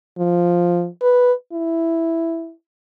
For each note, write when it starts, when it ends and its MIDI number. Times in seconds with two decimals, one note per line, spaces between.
0.19 0.88 53
1.02 1.33 71
1.53 2.52 64